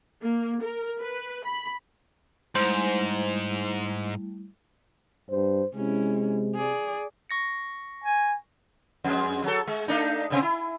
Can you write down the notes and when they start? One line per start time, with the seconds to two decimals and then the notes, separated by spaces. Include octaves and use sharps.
0.24 A#3
0.63 A#4
1.02 B4
1.45 B5
2.55 G#2 G3 A3 E4 C5
5.30 G2 C5
5.75 C3 G#3 C#4 E4
6.56 G#4 D5
7.30 C#6 A#6 C#7
8.05 G#5
9.04 F2 G#3
9.44 F#3 A4
9.67 G#3
9.88 A3 D4 D#4
10.30 G#2 C3 C4
10.42 E4